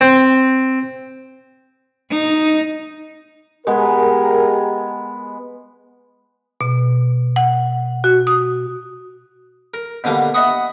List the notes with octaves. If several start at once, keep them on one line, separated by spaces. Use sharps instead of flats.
C4
D#4
G#3 B3 G4 G#4 A#4
B2
F#5
F#4
D#6
A#4
B2 D3 G3 A#3
D#5 E5 F#5 B5 C#6 D#6